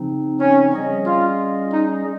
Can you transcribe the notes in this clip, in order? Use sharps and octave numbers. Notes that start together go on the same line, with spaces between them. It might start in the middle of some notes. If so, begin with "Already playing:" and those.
Already playing: C#3 F3 C4 D#4
C#4
G3 C#4 G#4 D#5
F4
D#4